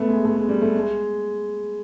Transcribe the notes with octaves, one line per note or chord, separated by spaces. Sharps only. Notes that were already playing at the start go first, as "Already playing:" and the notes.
Already playing: A3 B3
G#3
A3
G#3
G3
A3
G#3